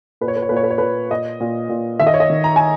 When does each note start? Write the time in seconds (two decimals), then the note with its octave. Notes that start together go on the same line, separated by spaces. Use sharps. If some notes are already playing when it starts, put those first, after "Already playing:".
0.21 A#2 B4
0.28 C#5
0.36 B4
0.42 C#5
0.49 A#2 B4
0.56 C#5
0.63 B4
0.71 C#5
0.78 A#2 B4
1.10 A#2 D#5
1.40 A#2
1.69 A#2
1.99 D#3 E5
2.07 D#5
2.14 C#5
2.20 D#5
2.30 D#3
2.44 A#5
2.56 G#5